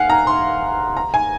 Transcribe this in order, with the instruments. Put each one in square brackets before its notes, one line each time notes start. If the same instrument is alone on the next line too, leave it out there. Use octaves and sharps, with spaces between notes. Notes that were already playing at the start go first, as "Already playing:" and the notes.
Already playing: [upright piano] F5 F#5 G#5
A#5
C6
A#5
G#5